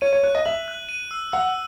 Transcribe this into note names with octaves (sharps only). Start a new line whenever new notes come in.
C#5 D#7
C#5
C#5 F#6
D#5
E5 F#7
F#6
D#7
E6
F#5 E6